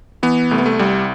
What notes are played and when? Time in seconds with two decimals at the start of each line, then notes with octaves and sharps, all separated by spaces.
0.23 E3 B3
0.51 C2 A3
0.58 B3
0.66 A3
0.79 C2 G3